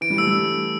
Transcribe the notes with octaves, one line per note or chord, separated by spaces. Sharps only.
E3 D7
G3
A3 E6
G3